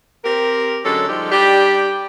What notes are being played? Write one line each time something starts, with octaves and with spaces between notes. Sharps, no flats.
C4 G4 A#4
D3 F#3 G#3 C#4 A4
F3 G3 G#3 D#4 G4
G3 D4 G4